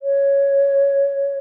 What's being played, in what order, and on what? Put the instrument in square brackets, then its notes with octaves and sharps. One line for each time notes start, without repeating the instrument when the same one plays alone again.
[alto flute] C#5